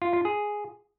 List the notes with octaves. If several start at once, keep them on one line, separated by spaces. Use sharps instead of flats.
F4
F4
G#4